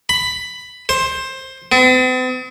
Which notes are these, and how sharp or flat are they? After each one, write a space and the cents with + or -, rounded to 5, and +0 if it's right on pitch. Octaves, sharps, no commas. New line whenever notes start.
B5 +10
C5 +15
C4 -45